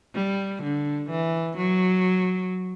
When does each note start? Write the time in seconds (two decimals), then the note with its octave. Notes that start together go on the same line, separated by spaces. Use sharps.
0.15 G3
0.63 D3
1.10 E3
1.58 F#3